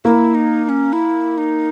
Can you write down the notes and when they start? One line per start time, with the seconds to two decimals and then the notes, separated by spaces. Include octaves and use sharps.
0.05 A#3 E4
0.35 D#4
0.64 D#4
0.69 C#4
0.93 E4
1.38 D#4